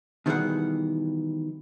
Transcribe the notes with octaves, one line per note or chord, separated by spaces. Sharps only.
B2 D#3 E3 G3 G#4 F#5